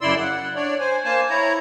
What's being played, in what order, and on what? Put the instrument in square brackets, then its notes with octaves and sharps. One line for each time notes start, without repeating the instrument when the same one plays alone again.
[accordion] F#2 C#3 E4 D5 C6 E6
F#5
D4 C#5 D5
C5 G#5
A#3 C5 G#5 A5
E4 C#5 A#5